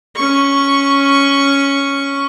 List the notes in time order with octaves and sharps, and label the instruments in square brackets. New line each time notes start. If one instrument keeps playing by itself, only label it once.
[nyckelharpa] C#4 C#6